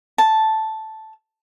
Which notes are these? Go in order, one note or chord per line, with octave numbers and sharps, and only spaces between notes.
A5